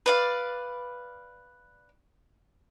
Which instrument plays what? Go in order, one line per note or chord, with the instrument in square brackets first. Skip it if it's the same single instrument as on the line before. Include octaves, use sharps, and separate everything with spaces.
[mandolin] B4 D5 F5